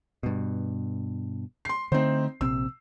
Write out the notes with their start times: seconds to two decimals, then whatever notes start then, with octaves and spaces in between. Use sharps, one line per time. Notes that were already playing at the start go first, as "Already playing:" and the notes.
0.23 G2 B2
1.65 C6 C7
1.92 D3 A3 C4 D#4 C5
2.41 A#1 C3 C4 E6